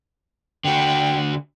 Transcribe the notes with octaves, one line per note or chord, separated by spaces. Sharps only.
D3 F#4 G5